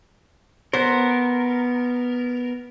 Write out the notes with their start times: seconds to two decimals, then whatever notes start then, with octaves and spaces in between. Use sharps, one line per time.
0.73 B3 A#4 C5